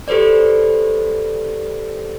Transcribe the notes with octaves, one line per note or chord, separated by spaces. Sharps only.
G4 A4 B4 C5 D5